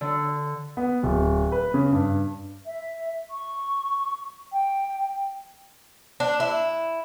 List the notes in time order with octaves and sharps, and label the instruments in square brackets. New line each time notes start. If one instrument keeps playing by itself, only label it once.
[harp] D3
[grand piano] B3
D1
B4
C#3
G2
[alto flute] E5
C#6
G5
[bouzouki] D4
E4